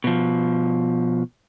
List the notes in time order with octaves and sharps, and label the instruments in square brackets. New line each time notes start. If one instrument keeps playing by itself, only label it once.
[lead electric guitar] B2 F3